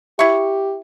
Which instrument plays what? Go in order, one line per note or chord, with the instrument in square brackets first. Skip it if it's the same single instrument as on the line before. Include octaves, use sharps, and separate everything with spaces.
[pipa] E4 C#6 [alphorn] G4 [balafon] E5